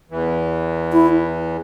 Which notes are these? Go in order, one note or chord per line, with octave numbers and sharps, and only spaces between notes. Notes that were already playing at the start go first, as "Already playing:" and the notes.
E2 E3
E4